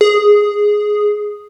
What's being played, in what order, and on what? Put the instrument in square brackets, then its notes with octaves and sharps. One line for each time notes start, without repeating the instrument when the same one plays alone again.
[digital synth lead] G#4